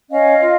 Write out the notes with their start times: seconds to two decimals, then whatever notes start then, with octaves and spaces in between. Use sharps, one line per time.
0.11 C#4 D#5 F5
0.40 F4